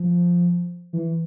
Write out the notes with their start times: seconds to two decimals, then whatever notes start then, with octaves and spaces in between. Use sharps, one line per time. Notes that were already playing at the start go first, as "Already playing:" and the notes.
Already playing: F3
0.93 E3